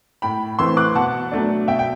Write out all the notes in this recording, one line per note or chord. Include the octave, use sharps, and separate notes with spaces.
A2 G5 B5
E3 A3 C4 C6 E6
D6 F#6
B2 F#5 A5
F#3 A3 D4
B2 E5 G5
G5